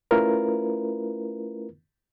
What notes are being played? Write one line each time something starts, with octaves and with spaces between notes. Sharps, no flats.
A3 C#4 E4 F4 A#4 B4